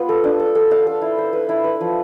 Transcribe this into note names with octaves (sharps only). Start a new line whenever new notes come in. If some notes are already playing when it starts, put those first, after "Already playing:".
Already playing: B3 F4
A4
D4
A4
A4
F5
A4
E4
C5
B4
E4
B4
F3